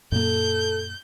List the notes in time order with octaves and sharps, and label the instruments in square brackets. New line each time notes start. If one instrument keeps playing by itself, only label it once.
[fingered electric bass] F#2 A#2 A#3 [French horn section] A4 [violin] G6